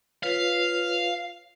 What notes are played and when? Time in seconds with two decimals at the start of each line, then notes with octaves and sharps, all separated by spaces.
0.23 F4 B4 C#5 F5